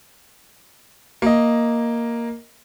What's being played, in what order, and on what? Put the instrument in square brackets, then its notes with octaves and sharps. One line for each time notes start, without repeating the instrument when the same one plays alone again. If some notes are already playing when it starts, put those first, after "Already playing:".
[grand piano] A#3 D#5